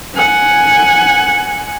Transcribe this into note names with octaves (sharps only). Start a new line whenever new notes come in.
F#5 G#5